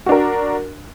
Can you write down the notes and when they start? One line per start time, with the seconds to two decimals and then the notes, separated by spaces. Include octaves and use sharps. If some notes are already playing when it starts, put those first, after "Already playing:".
0.06 F#4
0.09 D4
0.12 A#4